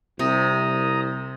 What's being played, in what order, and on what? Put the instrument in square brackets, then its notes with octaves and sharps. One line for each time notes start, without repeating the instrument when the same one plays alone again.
[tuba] C2 [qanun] C3 [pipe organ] A#5 D#6